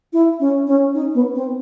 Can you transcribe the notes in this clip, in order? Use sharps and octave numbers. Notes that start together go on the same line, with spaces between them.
E4
C#4
C#4
D#4
B3
C4